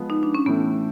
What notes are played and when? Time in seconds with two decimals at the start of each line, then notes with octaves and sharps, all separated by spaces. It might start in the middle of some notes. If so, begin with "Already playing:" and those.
Already playing: F3 G#3 B3
0.10 D#4
0.23 D4
0.35 C#4
0.46 A2 E3 A3 B3